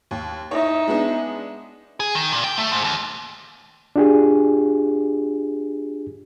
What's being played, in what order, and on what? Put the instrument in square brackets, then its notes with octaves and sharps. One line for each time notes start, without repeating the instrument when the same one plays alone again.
[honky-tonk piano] D#2
[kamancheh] D#4 E5 [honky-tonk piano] E4 C#5
[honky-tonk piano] G#3 B3 D4
[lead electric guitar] G#4
D#3
A#2
G5
A3
G#2
D#2
[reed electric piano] D4 F4 G4 G#4